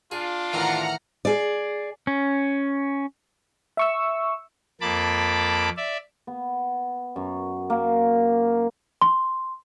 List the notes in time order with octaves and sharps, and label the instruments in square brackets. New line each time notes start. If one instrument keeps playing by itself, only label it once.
[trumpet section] D4 F4 [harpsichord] G#4
[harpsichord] A2 D#3 E3 [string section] F#5 A#5 F6
[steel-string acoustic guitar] G#4 D5
[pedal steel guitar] C#4
[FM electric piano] E5 C#6 E6
[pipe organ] F2 A#3 A5 B5 D6
D5 E5
[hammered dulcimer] B3
F#2
A#3
[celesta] C6